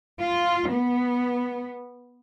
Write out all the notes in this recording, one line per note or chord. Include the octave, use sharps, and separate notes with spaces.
F4
B3